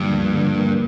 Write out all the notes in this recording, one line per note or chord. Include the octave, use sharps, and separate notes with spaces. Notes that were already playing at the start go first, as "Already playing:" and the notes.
Already playing: G2 D3 F3 A#3
D2
D3
A#3